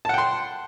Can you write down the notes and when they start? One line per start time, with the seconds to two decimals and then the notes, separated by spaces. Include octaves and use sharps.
0.05 A5
0.09 F#5
0.14 G5
0.18 C6